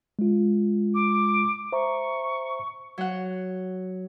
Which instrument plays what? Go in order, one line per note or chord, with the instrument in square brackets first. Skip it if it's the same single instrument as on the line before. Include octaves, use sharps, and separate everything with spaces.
[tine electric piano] G#3 F4
[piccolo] D6
[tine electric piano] C5 E5 A#5 [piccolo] C#6
[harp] F#3 F#5